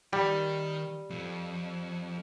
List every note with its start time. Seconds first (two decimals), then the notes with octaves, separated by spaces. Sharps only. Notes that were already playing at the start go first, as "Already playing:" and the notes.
0.13 D#3 G3 G5
1.10 F2